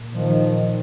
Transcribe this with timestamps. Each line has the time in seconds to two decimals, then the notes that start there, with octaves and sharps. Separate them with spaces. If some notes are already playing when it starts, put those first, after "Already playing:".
Already playing: A#2
0.15 D#3 F3